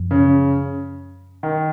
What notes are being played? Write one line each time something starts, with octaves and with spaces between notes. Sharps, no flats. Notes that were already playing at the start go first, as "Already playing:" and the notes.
Already playing: F#2 F3
C#3
D#3